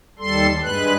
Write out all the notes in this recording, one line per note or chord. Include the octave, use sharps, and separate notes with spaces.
D#2 G3 A4 C6
G2 G#3 B4 F#6